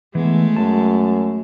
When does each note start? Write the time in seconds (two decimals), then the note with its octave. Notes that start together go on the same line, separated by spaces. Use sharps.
0.15 E3 G#3 A3 B3
0.56 F#2 A5